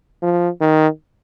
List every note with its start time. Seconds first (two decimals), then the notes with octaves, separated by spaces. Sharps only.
0.22 F3
0.61 D#3